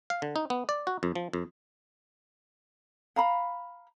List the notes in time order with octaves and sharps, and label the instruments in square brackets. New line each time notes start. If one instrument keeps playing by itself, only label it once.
[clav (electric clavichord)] F5
D3
D#4
B3
D5
F#4
F2
F3
F2
[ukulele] F5 A#5 B5